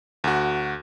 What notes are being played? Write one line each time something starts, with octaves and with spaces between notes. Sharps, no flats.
D2 F#4